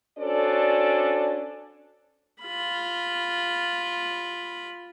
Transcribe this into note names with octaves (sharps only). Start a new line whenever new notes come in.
C#4 D4 F#4 A4 C5 D5
F4 B5